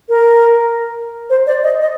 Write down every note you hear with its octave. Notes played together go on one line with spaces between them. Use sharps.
A#4
C5
D5
D#5
D#5